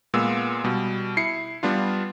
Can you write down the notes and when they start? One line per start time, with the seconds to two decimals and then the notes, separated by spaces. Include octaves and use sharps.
0.14 A#2 G#3 B3 E6
0.64 B2 G3
1.17 E4 C7 C#7
1.63 G3 B3 D4 F4